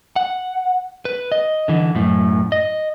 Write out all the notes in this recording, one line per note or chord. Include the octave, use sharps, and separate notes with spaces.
F#5
B4
D#5
D3 E3
F#2 A2
D#5